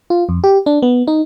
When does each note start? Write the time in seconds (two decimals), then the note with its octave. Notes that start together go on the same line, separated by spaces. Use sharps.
0.10 F4
0.29 F2
0.44 G4
0.66 D4
0.82 B3
1.07 D#4